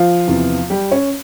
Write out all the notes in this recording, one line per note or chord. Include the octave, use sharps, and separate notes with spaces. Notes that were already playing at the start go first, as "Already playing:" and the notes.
Already playing: F3 F4
E2 C3 E3
G3 G4
C#4 C#5